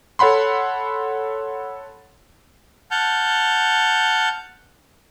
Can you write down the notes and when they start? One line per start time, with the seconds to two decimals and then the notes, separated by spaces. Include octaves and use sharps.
0.19 A4 C#5 F#5 B5 C6
2.91 F#5 A5 F6 G6